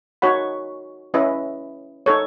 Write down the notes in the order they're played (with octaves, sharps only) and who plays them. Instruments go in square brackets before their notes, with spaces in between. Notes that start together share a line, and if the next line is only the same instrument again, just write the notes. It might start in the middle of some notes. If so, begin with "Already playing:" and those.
[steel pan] D#4 F#4 C#5 F#5 B5
C#4 E4 B4 D#5
D#4 A4 C#5